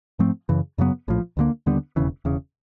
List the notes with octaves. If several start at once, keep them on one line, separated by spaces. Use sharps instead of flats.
G#2 F3 A3 C4
F#2 C#3 E3
F#2 C#3 F#3 B3
A#1 A2 F3
D2 D3 F3 A#3
D#2 D3 G3 B3
E1 D#2 C#3 E3
E1 E2 C#3